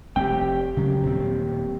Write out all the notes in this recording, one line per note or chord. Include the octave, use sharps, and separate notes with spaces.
F1 A3 C4 G4 G5
C#3 F#3
D#1 C4